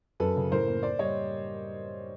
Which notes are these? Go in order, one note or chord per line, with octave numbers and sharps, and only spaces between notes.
F#2 A4 B4
C#3
A2 A#4 C5
A#3
A#3 C5 D5
G3 C#5 D#5